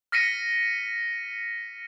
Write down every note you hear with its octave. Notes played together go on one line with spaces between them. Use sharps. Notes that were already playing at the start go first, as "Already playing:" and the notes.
F6 A#6 B6 C#7 D#7